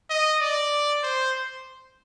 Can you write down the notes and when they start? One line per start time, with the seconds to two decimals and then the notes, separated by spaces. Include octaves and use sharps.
0.10 D#5
0.41 D5
1.03 C5